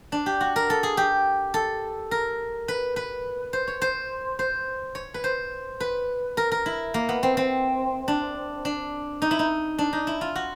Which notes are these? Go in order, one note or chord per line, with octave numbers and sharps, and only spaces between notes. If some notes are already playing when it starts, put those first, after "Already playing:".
D4
G4
F#4
A#4
A4
G#4
G4
A4
A#4
B4
B4
C5
C#5
C5
C5
C#5
B4
C5
B4
A#4
A#4
E4
A#3
B3
C4
C4
D4
D4
D#4
E4
D#4
D4
D#4
E4
F4
F#4